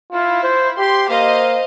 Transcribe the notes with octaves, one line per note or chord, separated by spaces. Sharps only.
E4 F4
C5
G4 C6
A#3 C5 D#5 F5